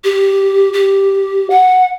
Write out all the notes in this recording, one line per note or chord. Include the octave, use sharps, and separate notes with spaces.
G4
G4
F#5